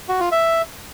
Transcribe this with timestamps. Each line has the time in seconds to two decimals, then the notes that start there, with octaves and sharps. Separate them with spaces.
0.09 F#4
0.20 F4
0.32 E5